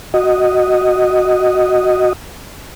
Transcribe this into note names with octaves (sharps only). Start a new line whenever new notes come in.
F#4 D#5